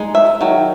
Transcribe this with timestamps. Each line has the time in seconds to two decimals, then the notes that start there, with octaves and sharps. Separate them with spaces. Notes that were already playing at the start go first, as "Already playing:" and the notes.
Already playing: G#3 D#4
0.15 E5
0.41 D#3 F#3